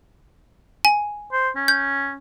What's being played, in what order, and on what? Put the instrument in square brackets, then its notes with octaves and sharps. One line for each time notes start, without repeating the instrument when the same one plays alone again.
[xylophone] G#5
[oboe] C5
C#4
[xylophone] G6